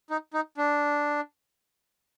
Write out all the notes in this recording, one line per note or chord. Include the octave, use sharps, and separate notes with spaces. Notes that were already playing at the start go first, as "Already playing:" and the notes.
D#4
D#4
D4